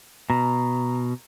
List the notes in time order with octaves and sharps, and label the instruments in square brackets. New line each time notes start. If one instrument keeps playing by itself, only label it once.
[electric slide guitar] B2 [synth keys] A#5